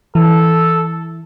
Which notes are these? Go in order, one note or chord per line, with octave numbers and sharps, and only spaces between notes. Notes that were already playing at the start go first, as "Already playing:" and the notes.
E3 A4